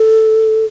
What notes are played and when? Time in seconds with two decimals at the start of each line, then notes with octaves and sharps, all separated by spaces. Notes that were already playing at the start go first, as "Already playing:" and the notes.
Already playing: A4